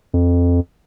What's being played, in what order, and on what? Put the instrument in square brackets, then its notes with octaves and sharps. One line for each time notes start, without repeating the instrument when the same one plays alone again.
[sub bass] F2